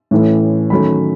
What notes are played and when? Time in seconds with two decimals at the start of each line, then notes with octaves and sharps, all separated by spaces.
0.11 A2 E3 A3 C#4
0.70 D#3 F#3 A3 C#4 B5